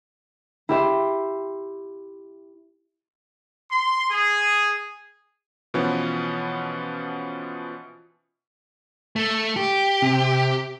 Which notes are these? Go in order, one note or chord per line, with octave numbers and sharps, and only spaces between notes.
E4 G4 E5 C6
C6
G#4
B2 E3 F3 B3 C#4
A3
G4
C3